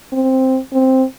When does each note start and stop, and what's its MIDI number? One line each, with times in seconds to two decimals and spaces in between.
0.13 0.59 60
0.73 1.03 60